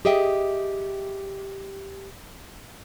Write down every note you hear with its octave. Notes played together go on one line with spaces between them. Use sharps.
G4 G#4 D#5 E5 G5